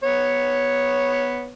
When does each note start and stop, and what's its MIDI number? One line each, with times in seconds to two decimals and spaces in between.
0.04 1.53 59
0.04 1.53 73